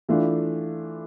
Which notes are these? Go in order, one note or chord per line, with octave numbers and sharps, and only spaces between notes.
E3 A3 D4 F4